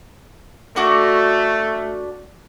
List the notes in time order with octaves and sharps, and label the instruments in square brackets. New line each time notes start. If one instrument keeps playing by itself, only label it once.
[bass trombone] A3 [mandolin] D4 F#4 D6